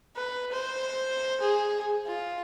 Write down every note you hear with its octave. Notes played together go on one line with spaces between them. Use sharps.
B4
C5
G#4
F4